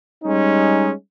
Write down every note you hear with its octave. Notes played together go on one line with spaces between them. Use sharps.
G3 G#3 C#4 D#4